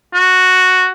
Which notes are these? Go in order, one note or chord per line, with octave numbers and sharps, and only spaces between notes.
F#4